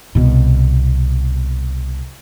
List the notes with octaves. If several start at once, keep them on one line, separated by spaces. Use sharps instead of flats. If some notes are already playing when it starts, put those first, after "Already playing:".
C2 B2